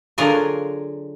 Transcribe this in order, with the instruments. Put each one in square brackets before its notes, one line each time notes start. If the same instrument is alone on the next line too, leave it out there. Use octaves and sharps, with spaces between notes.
[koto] D3 F#3 F4 G#4 A#4